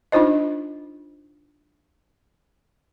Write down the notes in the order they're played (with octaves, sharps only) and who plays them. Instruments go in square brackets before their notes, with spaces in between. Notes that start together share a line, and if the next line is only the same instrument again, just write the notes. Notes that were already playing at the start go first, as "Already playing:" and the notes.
[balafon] D4 D#4 F4 C5 D#5